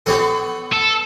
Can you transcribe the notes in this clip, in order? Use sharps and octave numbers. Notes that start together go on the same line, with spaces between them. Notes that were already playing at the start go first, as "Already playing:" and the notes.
F3 B3 G4 A4 C#5 D6
B3
A4